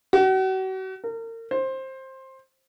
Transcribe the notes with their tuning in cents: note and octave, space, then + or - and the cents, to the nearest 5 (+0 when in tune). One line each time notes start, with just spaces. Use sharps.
F#4 +40
A#4 -35
C5 +15